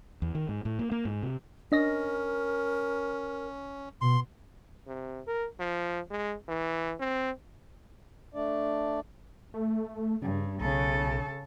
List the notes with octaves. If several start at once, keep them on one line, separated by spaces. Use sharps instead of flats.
E2
D#3
G#2
A2
A#3
A#3
G#2
C3
C#4 D4 A#4 D#5 A#6
B2 C6
C3
A#4
F3
G#3
E3
C4
A3 D4 D5
A3
G2 C#3
B1 C#3 A4